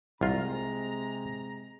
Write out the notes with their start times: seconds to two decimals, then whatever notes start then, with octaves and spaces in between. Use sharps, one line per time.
0.21 C2 C3 G#3 F4 A#5